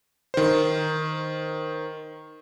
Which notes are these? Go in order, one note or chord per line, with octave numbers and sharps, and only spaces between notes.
D#3 C5